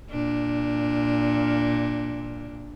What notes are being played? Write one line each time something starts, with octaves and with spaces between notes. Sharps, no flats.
A#2 D4